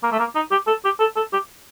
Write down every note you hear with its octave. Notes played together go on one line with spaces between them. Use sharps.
A#3
A3
A#3
D#4
G4
A4
G4
A4
A4
G4